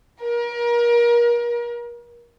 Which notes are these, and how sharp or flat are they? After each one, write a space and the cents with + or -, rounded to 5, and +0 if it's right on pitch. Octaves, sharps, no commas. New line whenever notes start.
A#4 +35